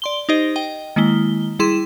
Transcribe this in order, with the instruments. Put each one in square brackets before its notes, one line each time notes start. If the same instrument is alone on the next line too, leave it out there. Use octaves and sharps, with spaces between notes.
[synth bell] D5 C6 G7
D#4 G4 C5 D#5
D#5 G5
D#3 G#3 A#3 E4 G7
G3 E4 G#4 C6 E7